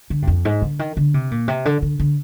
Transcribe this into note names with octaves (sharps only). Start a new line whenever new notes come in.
D3
G2
F2
G#2
D3
D#3
D3
C3
A#2
C3
D3
D3
D3